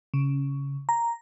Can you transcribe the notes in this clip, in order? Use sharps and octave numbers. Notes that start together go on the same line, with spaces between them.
C#3
A#5